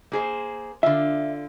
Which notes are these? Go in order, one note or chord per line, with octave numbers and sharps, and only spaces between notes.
A#3 G#4 C5
D3 F4 E5